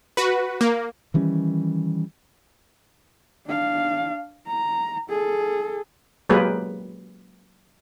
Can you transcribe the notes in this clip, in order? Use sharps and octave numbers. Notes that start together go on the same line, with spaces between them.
F#4 B4
A#3
D#3 E3 G3 C#4
D4 F5
A#5
G#4 A4
F#3 G#3 A#3 G4 G#4 B4